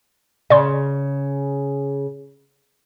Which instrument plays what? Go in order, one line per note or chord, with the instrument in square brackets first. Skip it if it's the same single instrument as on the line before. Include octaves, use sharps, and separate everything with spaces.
[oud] C#3 [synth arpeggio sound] D5 C6